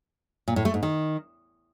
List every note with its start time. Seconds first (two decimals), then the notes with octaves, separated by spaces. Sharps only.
0.48 A#2
0.56 A2
0.65 A3
0.74 G#2
0.83 D#3